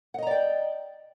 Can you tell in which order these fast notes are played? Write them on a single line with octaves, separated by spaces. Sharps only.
F#5 D#5 A#5 D5 G5